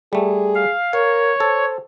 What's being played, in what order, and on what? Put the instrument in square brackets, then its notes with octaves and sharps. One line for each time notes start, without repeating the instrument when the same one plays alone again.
[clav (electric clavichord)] G3 A3 [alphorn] G#4
[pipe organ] F5
[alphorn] A#4 [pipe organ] C#5 [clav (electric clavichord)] F5
[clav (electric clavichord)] A4 [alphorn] C5